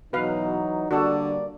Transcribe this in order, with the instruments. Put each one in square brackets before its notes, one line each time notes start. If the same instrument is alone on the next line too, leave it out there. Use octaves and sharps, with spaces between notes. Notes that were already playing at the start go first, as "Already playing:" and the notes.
[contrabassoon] B2 [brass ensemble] E3 F#3 [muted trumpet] D#4 [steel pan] B4 F5
[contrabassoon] D3 [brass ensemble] G3 A#3 [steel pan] F#4 A4 [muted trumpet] D5